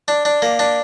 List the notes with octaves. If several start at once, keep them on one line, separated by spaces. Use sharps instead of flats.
D4
D4
A#3
D4